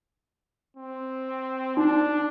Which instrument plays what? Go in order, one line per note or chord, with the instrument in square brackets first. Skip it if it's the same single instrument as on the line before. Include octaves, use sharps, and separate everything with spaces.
[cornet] C4
[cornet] D4 [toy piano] D#4